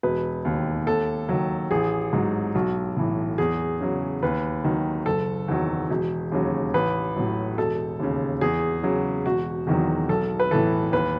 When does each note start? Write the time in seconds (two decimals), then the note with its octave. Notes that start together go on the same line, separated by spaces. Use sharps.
0.03 E1 B4
0.45 D#2 D#3
0.87 D#2 A4
1.29 D#3 F#3
1.71 A1 G#4
2.13 G#2 F#3
2.55 B1 F#4
2.97 A2 E3
3.38 E2 G#4
3.81 C#3 F#3
4.23 D#2 B4
4.64 D#3 F#3
5.06 F#1 A4
5.48 E2 D#3 F#3
5.91 E1
6.32 D#2 C#3 F#3
6.74 A1 B4
7.16 A2 F#3
7.58 E1 A4
8.00 D#2 C#3
8.41 E2 G#4
8.83 C#3 F#3
9.26 E1 F#4
9.67 E2 D#3 F#3
10.09 B1 A4
10.40 B4
10.51 A2 E3 A4
10.92 D#2 B4